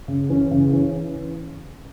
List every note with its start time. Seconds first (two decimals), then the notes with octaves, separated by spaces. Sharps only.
0.08 C#3
0.30 E3 C#4
0.51 C#3
0.73 E3 C#4